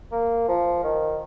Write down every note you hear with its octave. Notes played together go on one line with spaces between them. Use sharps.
A#3
F3
D#3